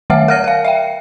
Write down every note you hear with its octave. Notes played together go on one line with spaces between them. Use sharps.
D#3 A3 C#5 E5 F#5 F6
A#4 F#5 F6 A#6 D#7
A#4 F5
E5 F5 G5